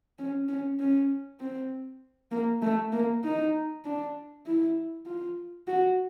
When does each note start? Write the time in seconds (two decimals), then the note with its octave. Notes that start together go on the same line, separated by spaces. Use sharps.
0.19 C#4
0.49 C#4
0.80 C#4
1.40 C4
2.31 A#3
2.62 A3
2.92 A#3
3.24 D#4
3.85 D4
4.46 E4
5.06 F4
5.67 F#4